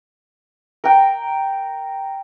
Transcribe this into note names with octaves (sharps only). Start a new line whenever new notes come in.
A#4 G5